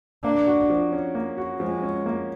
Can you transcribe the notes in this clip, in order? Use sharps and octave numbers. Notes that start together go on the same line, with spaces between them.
A#3 D4
F#4
F3
C#4
A#3
F#4
F3 G#3
C#4
A#3